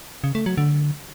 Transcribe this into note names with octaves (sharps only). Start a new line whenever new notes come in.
C#3
A3
F#3
D3